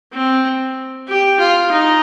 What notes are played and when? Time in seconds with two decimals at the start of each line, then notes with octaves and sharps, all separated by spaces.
0.13 C4
1.08 G4
1.40 F4
1.72 D#4